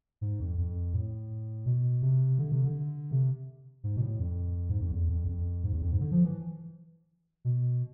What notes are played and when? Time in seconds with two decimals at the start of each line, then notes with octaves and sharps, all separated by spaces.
0.21 G#2
0.40 F2
0.58 F2
0.93 A2
1.66 B2
2.02 C3
2.39 D3
2.52 C3
2.65 D3
3.11 C3
3.84 G#2
3.96 B2
4.01 A2
4.20 F2
4.69 G#2
4.81 F2
4.92 E2
5.09 F2
5.24 E2
5.28 F2
5.64 G#2
5.73 E2
5.82 F2
5.91 G#2
6.00 D3
6.12 F3
6.25 E3
7.45 B2